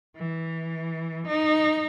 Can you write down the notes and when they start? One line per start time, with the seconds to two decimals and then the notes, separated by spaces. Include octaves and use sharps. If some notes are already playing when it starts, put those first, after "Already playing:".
0.16 E3
1.27 D#4